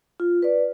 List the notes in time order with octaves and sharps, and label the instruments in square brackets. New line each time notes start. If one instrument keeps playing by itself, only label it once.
[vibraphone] F4
B4 D5